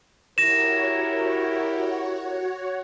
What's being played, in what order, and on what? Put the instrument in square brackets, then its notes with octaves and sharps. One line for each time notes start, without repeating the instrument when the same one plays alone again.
[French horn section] E4 G4 A#4 [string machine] F#4 C#5 [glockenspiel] A#6 E7